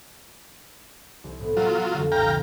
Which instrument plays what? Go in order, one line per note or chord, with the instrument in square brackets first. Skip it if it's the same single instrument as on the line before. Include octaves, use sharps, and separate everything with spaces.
[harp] C2
A2 B3
[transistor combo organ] F#3 F4 [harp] G3 B3
[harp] F2 D3
[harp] C2 A#2 [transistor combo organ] F5 G5 A#5